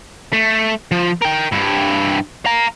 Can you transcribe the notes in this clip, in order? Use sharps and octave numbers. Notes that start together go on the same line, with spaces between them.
A3
F3
A#4 G5
G2 E4
F5 A#5